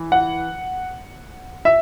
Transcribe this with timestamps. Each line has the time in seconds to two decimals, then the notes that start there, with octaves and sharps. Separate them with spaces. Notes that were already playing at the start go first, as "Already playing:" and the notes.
Already playing: E3
0.12 F#5
1.65 E5